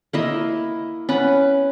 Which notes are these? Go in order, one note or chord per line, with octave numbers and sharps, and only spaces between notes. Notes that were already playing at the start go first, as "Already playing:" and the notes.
A#3 E4 D#5
C#4 B4 F#5